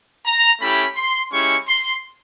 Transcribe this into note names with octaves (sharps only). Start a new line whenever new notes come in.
A#5
A3 C#4 E4 G4 B5
C6
G#3 C#4 E4 G4 C#6
C6